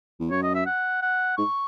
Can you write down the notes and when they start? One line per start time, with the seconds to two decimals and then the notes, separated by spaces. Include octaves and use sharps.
0.20 E2
0.31 F#2 C#5
0.43 D#5
0.55 E5
0.66 F#5
1.02 F#5
1.38 G#2 C#6